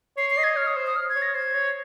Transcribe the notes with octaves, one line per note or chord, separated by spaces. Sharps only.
C#5 C7
C7
D#5
G#6
C#5 F6
D#6
C5
D#6
F6
G#6
C#5
A#6
C5 G#6
C#5